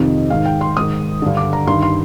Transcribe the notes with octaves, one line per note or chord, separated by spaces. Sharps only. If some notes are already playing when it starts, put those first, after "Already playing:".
Already playing: F2 C3 D#3 D#5
G#2 D#3 F5
G5
C6
G#2 D#3 D#6
G2 D3
D6
A#5
G2 D#3 C6
C6